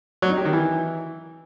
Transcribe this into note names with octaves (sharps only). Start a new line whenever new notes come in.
F#3
D#4
G4
D#3
E3